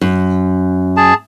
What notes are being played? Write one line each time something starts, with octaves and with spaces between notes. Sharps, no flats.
F#2
G#4 A5